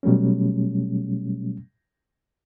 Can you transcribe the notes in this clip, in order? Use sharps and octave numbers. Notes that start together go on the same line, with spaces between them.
B2 F#3 G3 A3 C#4